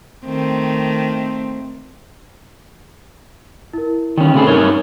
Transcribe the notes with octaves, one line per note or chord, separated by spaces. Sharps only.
D#3 A3 C4
E4 A#4
D#3 C#4 G5
C3 A3 G#4 B5
G2 D#4 A#4 C#5 G#6 G7